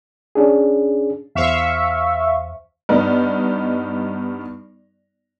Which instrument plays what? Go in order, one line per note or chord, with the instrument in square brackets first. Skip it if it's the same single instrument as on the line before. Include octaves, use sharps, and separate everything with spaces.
[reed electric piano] C#4 D4 G#4
[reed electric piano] E2 C5 [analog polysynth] E5 F5 C#6
[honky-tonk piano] G2 B3 D#4